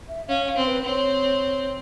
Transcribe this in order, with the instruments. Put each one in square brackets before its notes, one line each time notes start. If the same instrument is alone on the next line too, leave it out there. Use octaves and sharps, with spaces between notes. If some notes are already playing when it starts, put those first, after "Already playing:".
[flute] E5
[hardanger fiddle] C#4 [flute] F5
[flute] F5
[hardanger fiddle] C4
[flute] B4
[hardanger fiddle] C4 [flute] C#5